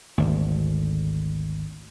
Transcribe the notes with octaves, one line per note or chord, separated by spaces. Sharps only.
G#1 D2